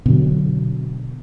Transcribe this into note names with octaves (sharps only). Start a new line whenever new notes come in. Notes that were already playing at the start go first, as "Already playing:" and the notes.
B2 D3 F#3